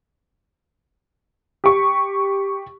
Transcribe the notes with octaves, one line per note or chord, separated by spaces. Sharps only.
G4 C#6